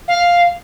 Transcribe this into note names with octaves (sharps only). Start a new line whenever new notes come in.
F5